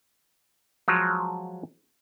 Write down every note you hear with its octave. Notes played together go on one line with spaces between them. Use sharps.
F3 F#3 G#3